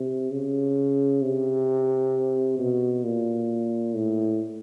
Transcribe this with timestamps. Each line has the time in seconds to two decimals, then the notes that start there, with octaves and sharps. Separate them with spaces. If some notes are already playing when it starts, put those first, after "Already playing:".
Already playing: C3
0.31 C#3
1.22 C3
2.59 B2
3.04 A#2
3.95 A2